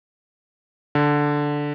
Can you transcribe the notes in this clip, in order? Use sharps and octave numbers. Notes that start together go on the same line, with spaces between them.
D3